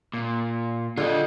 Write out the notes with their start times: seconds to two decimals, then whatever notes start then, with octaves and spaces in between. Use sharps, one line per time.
0.14 A#2
0.97 D3 F4 G#4 D#5